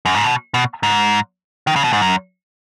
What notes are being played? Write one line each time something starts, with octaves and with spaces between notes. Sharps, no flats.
F#2
G#2
B2
B2
G#2
D#3
C#3
B2
G#2
F#2